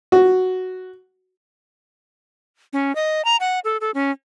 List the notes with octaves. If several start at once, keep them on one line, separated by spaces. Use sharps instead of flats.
F#4
C#4
D#5
A#5
F#5
A4
A4
C#4